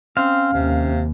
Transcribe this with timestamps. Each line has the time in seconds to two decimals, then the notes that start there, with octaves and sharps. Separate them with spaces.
0.17 C4 C#4 F5
0.53 D#2 C3